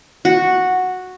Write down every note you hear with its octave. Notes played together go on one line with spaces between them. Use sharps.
F#4